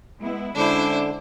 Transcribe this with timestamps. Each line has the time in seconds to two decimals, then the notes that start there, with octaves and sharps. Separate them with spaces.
0.22 G#3 B3 E4
0.55 D3 G#3 C#4 D4 E4 C5